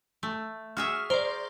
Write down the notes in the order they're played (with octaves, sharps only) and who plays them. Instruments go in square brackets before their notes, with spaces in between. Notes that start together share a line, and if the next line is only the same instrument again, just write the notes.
[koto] A3
[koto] F#4 G#4 E5 [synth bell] F6
[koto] A#4 [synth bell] C5 D5